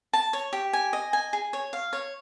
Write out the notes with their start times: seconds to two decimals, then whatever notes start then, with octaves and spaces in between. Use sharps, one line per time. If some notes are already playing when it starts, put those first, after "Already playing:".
0.13 A5
0.33 C#5
0.53 G4
0.73 G#5
0.93 D#5
1.13 G#5
1.33 G#4
1.53 C#5
1.73 F5
1.93 C#5